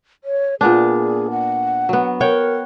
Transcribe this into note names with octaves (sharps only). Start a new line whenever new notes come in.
C#5
A#2 B3 D4 G#4
F#5
F#3 B3
A#4 C#5 F#5 G5